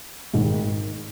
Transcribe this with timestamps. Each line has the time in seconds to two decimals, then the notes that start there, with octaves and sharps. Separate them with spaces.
0.34 G#1 G#2 D#3